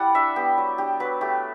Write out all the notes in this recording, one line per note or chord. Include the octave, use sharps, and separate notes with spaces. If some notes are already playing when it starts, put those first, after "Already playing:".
Already playing: G3 E4 D5 F#5
D4 E5
B3 G4
F#3
D4 G4
F#3 B4
A3 G4